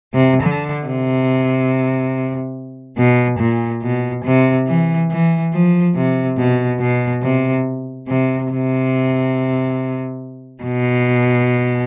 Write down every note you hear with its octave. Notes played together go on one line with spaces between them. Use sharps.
C3
D3
C3
B2
A#2
B2
C3
E3
E3
F3
C3
B2
B2
C3
C3
C3
B2